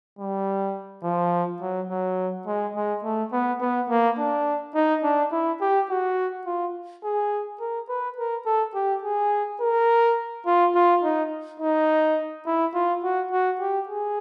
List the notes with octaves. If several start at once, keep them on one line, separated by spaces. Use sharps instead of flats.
G3
F3
F#3
F#3
G#3
G#3
A3
B3
B3
A#3
D4
D#4
D4
E4
G4
F#4
F4
G#4
A#4
B4
A#4
A4
G4
G#4
A#4
F4
F4
D#4
D#4
E4
F4
F#4
F#4
G4
G#4